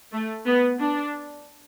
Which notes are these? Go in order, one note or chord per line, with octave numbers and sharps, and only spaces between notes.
A3
B3
D4